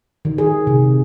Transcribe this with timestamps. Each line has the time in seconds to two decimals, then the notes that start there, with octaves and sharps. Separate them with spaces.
0.25 D#3
0.38 G#4
0.67 C3